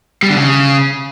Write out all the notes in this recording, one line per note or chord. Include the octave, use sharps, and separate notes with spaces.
G3
D3
C#3